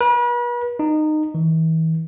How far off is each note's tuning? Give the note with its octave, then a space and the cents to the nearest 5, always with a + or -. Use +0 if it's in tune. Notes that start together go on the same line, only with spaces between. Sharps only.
B4 -40
D#4 -20
E3 -40